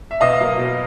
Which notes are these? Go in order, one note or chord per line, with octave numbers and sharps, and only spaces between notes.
E5
B2 D#5 F5
F#3 A#3
B2